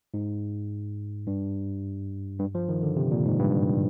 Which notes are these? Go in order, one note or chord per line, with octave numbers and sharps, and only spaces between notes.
G#2
G2
G2
F3
D#3
D3
C3
A#2
G#2
G2